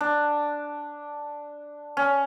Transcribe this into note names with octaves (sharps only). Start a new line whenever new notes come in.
D4
C#4